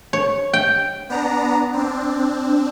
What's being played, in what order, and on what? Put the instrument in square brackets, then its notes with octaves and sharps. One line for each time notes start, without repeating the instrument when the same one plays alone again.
[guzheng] C#5
G5
[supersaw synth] B3 D4 A#5
C4 D4